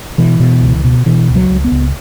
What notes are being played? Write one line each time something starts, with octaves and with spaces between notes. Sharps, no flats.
B2 E3
B2
C#2
B2
B2 E3
C#2
F#3
C#2
B3
C#2